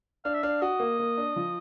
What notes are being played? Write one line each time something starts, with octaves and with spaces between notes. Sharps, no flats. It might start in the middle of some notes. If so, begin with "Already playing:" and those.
D4 F5
E5
D4 F5
F#4 D#5
A#3
A#3
D4
F3